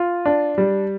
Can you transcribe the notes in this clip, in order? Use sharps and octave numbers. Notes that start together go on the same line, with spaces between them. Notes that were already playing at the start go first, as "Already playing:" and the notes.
Already playing: F4
D4
G3